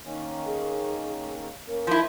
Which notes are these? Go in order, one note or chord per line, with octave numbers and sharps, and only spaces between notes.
D#3 A#3 C#4
G#4
A#3 C#4 A#4
D#3 F3 E4